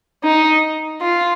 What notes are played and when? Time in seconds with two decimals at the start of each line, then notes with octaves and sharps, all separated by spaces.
0.24 D#4
1.01 F4